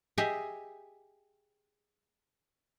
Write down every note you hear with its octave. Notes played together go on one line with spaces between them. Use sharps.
G4 G#4 D#5 E5 G#5